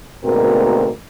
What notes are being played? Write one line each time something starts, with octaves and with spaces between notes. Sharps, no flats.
D2 G#2 B2 A#3 C4 A#4